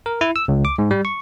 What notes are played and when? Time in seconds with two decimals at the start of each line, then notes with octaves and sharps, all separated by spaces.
0.06 A#4
0.21 E4
0.36 E6
0.48 C#2
0.65 D6
0.78 G#2
0.91 G3
1.05 C#6